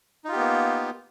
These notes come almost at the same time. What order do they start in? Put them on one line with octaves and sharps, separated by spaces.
D#4 F4 G4 B3 A#3